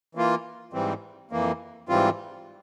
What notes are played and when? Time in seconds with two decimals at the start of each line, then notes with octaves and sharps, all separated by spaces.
0.15 E3 A#3 F4
0.73 G#2 E3 G3 C4
1.31 F2 E3 A#3
1.89 G#2 E3 G3 C4 F4